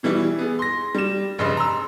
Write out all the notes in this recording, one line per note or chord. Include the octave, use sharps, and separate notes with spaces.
B2 E3 G3 E4
B3 G#4
C6 A#6
G3 E7
F1 G2 C#3 D#5 C6
A#5 C6 E6